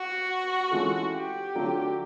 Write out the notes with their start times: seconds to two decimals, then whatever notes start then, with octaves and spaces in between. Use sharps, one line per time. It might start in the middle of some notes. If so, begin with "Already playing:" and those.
Already playing: F#4
0.71 E3 G#3 C#4 F4 A4
1.13 G4
1.55 D3 F#3 A3 D4 F4